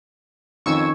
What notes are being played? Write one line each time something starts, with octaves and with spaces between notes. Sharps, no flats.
F2 D#3 C#4 C#6 E6 G#6